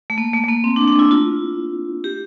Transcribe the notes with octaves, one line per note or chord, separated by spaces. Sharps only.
A3
A#3
A3
A3
A#3
C4
D4
D4
E4
F4
G4